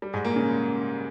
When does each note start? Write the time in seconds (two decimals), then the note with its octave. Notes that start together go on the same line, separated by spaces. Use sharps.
0.02 G3
0.14 G#2 G#3
0.25 A#2 A#3
0.36 C#3 C#4